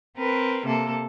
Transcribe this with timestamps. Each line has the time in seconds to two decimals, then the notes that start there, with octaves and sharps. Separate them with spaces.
0.17 C4 A#4 B4
0.66 C3 A#3 A4